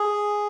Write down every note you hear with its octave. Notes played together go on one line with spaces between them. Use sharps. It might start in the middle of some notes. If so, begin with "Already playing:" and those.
Already playing: G#4